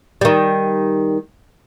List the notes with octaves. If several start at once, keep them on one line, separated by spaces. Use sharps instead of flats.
D#3 G3